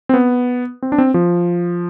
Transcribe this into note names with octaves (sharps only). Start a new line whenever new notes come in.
C4
B3
C4
D4
C4
F3